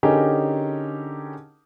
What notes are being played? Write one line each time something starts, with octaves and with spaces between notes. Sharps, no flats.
D3 C#4 D#4 G4 G#4 A#4